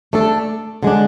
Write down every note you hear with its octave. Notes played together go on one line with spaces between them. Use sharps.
A3 D4 A4
D3 G#3 D4